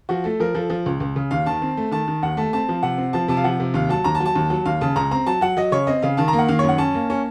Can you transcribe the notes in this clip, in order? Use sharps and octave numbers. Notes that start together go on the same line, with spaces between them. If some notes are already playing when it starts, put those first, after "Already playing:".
F3 F#4
A3 A4
F3 A#4
F3 A4
F3
C#2
C#2
C#3
D#2 F5
D#3 A5
C4
A3
D#3 A5
D#3
D#2 F#5
A3 A5
C4 A5
F3
C3 F#5
C4
F3 A5
C3 A5
F5
F3 F#5
C3
D#2 F5
F#3 A5
D#2 A#5
A5
F#3
A5
D#2
F#3
D#2 F5
C#3 A5
C#2 A#5
C4 A#5
F#3 A5
F#3 F#5
F#3 D#5
C#3 C#5
C4 D#5
C#3 F5
D#3 A5
A#5
A#3
F#5
D#3 F5
F#2 C#5
F#5
C#4 A5
A#3
C#4